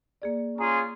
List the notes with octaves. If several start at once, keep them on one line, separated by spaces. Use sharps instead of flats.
A#3 G#4 D5
C#4 F4 G#4 A#5